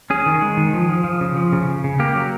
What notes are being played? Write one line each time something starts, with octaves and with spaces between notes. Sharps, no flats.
C#4 G#4
D#3
G#3
D#3
F3
F3
F3
C#3
F3
C#3
C#3
C#3
A#3 G4
F#3